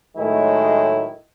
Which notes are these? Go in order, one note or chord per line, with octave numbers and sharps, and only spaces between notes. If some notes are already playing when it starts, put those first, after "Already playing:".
A2 D#3 F#3 G#3 A3 E4